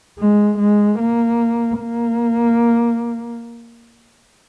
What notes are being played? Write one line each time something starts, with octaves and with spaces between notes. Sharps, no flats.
G#3
G#3
A#3
A#3